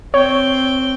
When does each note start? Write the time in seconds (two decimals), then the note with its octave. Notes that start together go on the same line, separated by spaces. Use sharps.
0.14 C4 C#5 G5